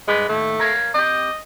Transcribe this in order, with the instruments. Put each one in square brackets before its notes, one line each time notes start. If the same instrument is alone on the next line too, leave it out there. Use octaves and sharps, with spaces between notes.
[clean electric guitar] G2 B4 D5 [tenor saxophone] G#3
[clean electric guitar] D#2 A2 [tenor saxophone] A3
[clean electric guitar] A#4 C#5 F5
[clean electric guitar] C4 G4 [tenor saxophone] D#5